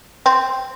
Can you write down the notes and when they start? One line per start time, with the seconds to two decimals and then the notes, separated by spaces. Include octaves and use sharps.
0.26 C4